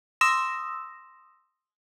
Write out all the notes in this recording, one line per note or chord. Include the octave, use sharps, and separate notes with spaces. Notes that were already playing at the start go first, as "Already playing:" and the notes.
C6 D#6 E6 A#6 E7